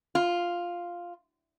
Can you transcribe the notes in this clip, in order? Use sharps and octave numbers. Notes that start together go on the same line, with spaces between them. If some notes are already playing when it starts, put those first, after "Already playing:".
F4